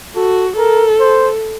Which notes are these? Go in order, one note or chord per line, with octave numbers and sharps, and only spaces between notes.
F#4 A4
A4 A#4
C5